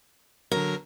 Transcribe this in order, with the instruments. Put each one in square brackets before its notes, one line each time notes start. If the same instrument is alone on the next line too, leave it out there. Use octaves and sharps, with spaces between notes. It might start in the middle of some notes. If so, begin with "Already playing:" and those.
[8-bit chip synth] D3 F#3 [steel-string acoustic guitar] A#4